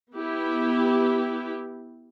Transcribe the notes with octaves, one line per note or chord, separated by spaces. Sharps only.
B3 E4 G4